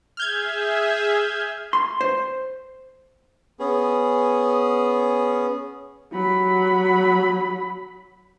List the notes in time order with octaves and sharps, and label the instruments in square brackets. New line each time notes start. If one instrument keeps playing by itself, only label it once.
[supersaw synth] G#4 E5 [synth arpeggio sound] F6 G6 G#6
[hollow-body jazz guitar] C6
C5
[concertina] B3 C#4 G#4
[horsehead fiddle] F#3 B5